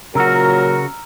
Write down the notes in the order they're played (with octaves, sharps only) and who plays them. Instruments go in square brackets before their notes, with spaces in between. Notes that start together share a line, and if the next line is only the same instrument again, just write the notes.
[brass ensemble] A#2 F#3 [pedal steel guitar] C#3 F#4 [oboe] A#4 [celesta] A#5 E6 F6